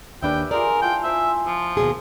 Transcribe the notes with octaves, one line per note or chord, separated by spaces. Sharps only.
D#2 D4 G4 B4 E5 G5
F4 G#4 A#4 D5
E4 F4 G5 A5
C5 E5 G#5
F3 E6
D#2 B2 G#4